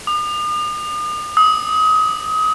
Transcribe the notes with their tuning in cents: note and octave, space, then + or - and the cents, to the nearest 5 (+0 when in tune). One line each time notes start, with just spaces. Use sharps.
D#6 -45
D#6 +30